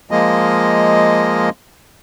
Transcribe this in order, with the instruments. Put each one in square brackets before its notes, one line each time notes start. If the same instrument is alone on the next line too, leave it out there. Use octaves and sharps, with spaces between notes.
[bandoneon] F3 G#3 A#3 D#5